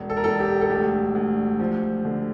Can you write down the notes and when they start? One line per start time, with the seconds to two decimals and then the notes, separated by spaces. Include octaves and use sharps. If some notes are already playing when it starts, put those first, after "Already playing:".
Already playing: E1
0.10 A4
0.17 A#4
0.24 E1 A4
0.40 G4
0.61 A4
0.70 D2 G4
1.15 D2
1.59 F3
2.05 D3